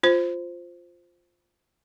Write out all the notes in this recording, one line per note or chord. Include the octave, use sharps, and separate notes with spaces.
F4 C5